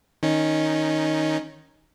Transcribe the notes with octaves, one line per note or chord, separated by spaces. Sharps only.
D#3 C#4 D#4